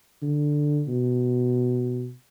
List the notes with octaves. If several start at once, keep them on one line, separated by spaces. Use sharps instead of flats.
D3
B2